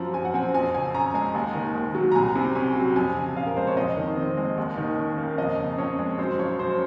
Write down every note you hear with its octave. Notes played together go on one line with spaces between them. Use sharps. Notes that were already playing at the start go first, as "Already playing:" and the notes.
Already playing: F#2 F3 A#5
F#2 G#5
F#5
C4 G#5
F2 G#5
C#3 G#5
C#4 A#5
G#3 G#5
D#2
D#3
D#2
F#3
A#5
C2 G#5
C3
C#4 G#5
F#3
F2 G#5
C#3
F2 F5
A#4
G#3 C5
C#5
F2 D#5
D#3
C4
G#3
D#2
D#3
C#4
A#3
F2 D#5
C#3
F2 C#5
G#3
F#2 C5
F3 C#5
F#2 C5